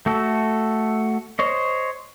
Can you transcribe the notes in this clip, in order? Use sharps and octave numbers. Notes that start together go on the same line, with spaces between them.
A3 F#4 A4
C5 C#5 D#5